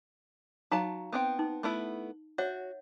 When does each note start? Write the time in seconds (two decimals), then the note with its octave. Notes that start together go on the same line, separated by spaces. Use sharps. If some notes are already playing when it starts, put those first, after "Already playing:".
0.71 F#3 D#4 F5 A5 A#5
1.13 B3 C4 G5
1.39 D#4
1.63 A3 B3 E4
2.38 F#4 C#5 E5 F#5